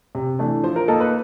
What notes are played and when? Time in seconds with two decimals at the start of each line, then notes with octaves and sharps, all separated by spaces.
0.15 C3
0.39 E3 A3 D4
0.64 F3 C5
0.76 A#4
0.88 A#3 D#4 A4
1.00 B4